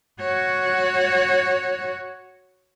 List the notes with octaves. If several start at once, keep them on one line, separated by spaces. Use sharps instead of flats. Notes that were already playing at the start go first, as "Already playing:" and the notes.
F#4 C#5